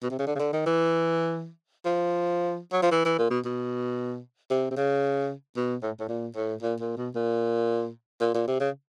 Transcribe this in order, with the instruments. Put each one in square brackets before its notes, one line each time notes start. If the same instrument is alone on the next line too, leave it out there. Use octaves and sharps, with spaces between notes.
[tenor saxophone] B2
C3
C#3
D3
C#3
D3
D#3
E3
F3
F#3
F3
E3
E3
A#2
B2
B2
C3
C3
C#3
B2
A2
A2
A#2
A2
A#2
A#2
B2
A#2
A#2
A#2
C3
C#3